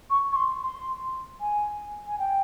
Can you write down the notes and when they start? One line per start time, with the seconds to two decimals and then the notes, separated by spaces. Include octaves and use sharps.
0.10 C#6
0.32 C#6
0.36 C6
0.63 C6
1.41 G#5
2.07 G#5
2.19 G5